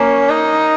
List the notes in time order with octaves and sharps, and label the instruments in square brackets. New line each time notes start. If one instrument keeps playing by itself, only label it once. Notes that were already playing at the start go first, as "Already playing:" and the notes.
Already playing: [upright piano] A#3 [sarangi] C#4
[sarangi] D#4